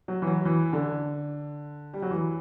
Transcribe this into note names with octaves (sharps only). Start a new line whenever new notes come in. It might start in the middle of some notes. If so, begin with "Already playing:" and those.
F#3
E3
F#3
E3
D3
G3
F#3
E3